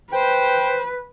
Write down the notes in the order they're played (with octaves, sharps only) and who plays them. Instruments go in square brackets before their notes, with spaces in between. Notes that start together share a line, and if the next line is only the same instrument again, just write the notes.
[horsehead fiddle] B4 [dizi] C5 [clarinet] G5